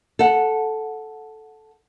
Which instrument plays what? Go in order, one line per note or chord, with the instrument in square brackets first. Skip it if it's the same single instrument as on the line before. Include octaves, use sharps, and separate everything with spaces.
[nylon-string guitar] A4 F#5